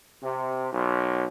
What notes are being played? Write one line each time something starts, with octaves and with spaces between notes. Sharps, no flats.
C3
B1